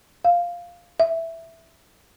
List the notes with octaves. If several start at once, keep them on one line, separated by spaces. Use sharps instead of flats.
F5
E5